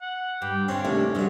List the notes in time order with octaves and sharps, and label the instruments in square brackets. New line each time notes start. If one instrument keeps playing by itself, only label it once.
[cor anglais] F#5
[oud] G2 [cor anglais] G4
[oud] D3 F4 [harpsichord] C4 [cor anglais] C#4
[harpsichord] D#2 A2 C3 [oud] D4
[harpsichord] G2 D3 [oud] F3 F#3